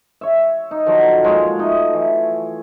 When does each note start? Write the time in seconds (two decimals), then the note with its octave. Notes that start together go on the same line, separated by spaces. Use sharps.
0.21 C#5 E5
0.71 D#4
0.86 D3 D#3 F3 F#3
1.24 F3 G#3 A#3 C#5
1.59 A3 D#4 D#5
1.93 E3